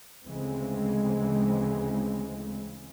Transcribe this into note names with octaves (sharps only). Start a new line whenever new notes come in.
D2 C#3 E3 G#3 C4